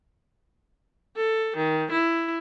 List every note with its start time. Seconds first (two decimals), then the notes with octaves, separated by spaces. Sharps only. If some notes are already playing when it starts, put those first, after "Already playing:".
1.16 A4
1.56 D#3
1.91 E4